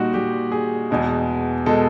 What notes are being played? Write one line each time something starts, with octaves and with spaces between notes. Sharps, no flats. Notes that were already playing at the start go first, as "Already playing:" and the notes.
Already playing: A#2 G3 D#4 F#4
A#2 G3 G4
G#4
E2 B2 G#3
B2 G#3 A4